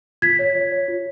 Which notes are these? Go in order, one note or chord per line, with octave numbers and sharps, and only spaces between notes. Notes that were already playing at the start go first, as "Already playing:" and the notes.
F4 G#6 B6
C#5
C#5
C#5
F4